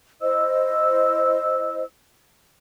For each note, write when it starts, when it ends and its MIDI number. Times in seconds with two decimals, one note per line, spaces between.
0.22 1.83 64
0.22 1.83 72
0.22 1.83 75
0.22 1.83 88